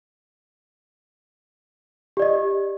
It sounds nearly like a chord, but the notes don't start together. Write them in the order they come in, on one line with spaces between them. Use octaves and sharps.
G4 D5 D#5